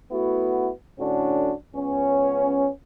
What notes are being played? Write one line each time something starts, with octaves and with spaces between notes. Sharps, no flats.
A3 B3 E4 F#4
A2 D3 C#4 D4 F#4
C#2 B3 C#4